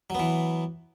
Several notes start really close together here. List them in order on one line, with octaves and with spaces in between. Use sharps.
F#3 B3 E3